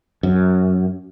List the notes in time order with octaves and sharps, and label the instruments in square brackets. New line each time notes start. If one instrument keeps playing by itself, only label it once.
[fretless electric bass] F#2